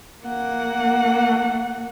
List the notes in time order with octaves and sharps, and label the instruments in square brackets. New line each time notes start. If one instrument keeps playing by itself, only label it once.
[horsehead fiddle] A#3 F#5